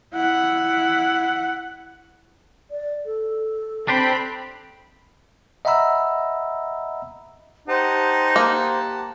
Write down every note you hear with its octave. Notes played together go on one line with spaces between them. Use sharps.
E4 F#5
D5
A4
C4 D4 G4 C5 B5
D#5 E5 F#5 A#5 B5 E6
D#4 G4 C5 F#5 A5
A#3